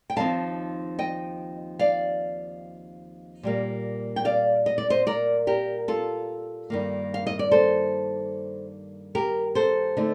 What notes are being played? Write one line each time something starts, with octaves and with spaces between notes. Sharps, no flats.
G5
D#2 D3 F3 C4 D#4 F5 A5
D#5 G5
D5 F5
A#2 G3 A#3
G5
D5 F5
D#5
D5
C5 D#5
A#4 D5
G4 A#4
F4 A4
G2 D#3 A#3
F5
D#5
D5
A4 C5
G4 A#4
A4 C5
D3 A3 D#4